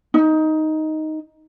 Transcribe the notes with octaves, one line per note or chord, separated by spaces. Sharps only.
D#4